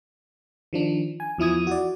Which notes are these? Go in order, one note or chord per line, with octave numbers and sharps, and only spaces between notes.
D#3 F3 D4
G#5
E2 F3 E4 D#6 G#6
F#4 D5